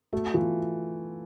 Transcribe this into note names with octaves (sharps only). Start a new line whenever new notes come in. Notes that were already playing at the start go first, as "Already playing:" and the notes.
A3 F#4
E3 F4